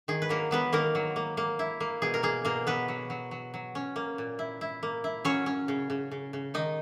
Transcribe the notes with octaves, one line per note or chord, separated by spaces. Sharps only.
D#3 G#4
B4
F#3 A#3 A#4
F#3 B3 B4
D#3 A#3 A#4
F#3
A#3
A#3
E4
A#3
B2 G#4
A#4
A#3 G#4
B2 A#3 A#4
F#3 B3 B4
F#3
F#3
F#3
F#3
C#4
A#3
A#2
E4
E4
A#3
E4
F#3 C#4 C#5
C#4
C#3
C#3
C#3
C#3
D#3 D#4 D#5